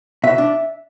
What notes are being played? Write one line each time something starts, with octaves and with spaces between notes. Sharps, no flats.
B2 E5
D4